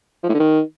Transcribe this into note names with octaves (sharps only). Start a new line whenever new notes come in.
F3
A2
D3
D#3